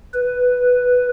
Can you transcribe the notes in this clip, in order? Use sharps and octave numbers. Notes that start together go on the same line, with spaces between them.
B4